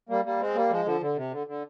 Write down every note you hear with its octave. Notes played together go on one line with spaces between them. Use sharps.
G3 A#3
G3 A#3
G#3 C4
G3 A#3
F3 G#3
D3 F3
D3
C3
D3
D3